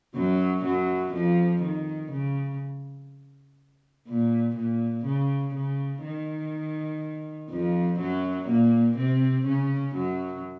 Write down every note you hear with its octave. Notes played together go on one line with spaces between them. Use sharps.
F#2 F#3
F#2 F#3
F2 F3
D#3
C#3
A#2
A#2
C#3
C#3
D#3
F2 F3
F#2 F#3
A#2 A#3
C3 C4
C#3 C#4
F#2 F#3